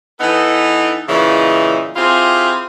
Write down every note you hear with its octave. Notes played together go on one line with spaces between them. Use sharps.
E3 B3 D#4 A4
A#2 C#3 E3 D#4
C4 E4 F4 G4 G#4